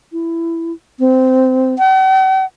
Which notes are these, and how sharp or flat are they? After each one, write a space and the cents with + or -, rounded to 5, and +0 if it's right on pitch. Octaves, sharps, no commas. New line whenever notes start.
E4 +10
C4 -15
F#5 +45